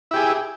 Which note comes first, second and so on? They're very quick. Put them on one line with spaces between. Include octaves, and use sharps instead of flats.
E4 G4 G#4